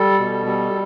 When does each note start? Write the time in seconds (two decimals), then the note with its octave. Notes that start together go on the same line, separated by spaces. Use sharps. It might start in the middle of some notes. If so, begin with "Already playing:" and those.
Already playing: G3 A4
0.19 B2
0.46 G3